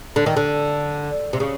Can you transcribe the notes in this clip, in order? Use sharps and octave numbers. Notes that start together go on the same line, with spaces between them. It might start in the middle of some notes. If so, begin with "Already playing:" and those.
D3
D#3
D3
C3
C#3